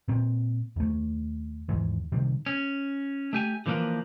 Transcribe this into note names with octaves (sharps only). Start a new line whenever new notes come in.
A#2 C4
D#2 A3
D#2 G#2 E3 G#3
C3 D#3 G3
C#4
A3 G4 G#5
D3 E3 F3 A#3 A#4 B4